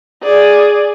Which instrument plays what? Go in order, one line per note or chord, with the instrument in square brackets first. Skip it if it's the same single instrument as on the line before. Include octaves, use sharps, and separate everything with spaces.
[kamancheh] G#4 D5